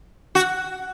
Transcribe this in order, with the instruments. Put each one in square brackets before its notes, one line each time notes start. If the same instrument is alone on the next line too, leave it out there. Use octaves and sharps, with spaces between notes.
[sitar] F#4